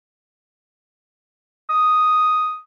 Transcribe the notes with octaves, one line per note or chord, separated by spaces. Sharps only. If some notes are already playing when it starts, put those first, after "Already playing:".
D#6